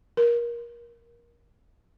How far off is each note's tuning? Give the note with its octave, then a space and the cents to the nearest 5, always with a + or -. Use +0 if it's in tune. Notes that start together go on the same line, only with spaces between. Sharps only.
A#4 +25